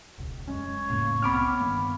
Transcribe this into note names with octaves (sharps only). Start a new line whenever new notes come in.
E1 C#2
F#2 G#3 C#4 C#5
F1 A2 C#3 A#3
F#1 C2 B3 C4 B5 D6 F6
G2 D#3 A#3